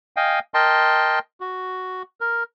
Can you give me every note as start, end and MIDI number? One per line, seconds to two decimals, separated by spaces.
0.16 0.39 75
0.16 0.39 77
0.16 0.39 79
0.16 0.39 80
0.54 1.19 70
0.54 1.19 75
0.54 1.19 79
0.54 1.19 81
0.54 1.19 84
1.40 2.02 66
2.21 2.43 70